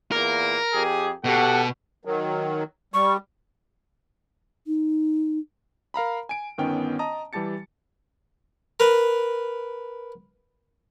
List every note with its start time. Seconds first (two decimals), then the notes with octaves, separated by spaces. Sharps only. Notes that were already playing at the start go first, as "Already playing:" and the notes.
0.12 E2 A#2 A#3 A#4
0.72 F2 G4 G#4
1.24 B2 G4 A4 F#5
2.05 D#3 F#3
2.94 G3 C#6
4.67 D#4
5.94 A#4 F5 A#5 B5
6.29 G#5 D7
6.58 G1 D#3 B3 C#4 G5
6.99 D#5 A5 A#5 D#6
7.33 E3 G3 G4 A5 A6 C#7
8.80 A#4 B4